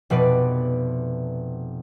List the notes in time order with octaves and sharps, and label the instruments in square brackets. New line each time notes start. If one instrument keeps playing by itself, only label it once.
[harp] F1 B2 B4 D5